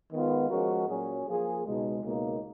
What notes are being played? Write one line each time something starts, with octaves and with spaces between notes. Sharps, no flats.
D#3 G#3 B3 F4
F3 G#3 C#4 F#4 A#4
A#2 F#3 C#4 G#4
F3 A#3 F4 G#4
C#2 B2 G#3 D#4
C#2 B2 A#3 D#4